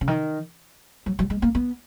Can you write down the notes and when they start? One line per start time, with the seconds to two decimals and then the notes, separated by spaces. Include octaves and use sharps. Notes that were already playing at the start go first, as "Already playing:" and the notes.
0.01 C#3
0.08 D#3
1.06 F#3
1.19 F#3
1.30 G#3
1.42 A#3
1.55 B3